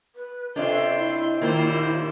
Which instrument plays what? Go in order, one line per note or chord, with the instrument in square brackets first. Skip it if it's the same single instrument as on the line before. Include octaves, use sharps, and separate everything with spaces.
[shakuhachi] B4
[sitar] C3 D4 [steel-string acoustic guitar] F4 C#5 D#5 [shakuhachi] A4 [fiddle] G5 C6
[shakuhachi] E4
[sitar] D#2 A#2 D#3 [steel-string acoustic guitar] A#3 C4 F4 [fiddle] C5